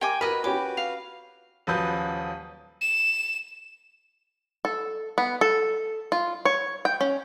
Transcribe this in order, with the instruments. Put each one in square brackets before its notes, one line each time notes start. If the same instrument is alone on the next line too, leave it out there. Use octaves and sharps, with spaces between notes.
[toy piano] G4 E5 D6 [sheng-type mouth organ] A#4 [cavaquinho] G5 G#5
[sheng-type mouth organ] F#4 B4 [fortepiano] A#4 [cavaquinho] D#5 B5 [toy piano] A#5
[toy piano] C#4 F4 [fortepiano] G4 C#5 G#5 [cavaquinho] D6
[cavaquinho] F5
[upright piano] D#1 F3 F#3 B4 D#6 G6
[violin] E7
[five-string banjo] A4
B3
A4
F4
C#5
G5
C#4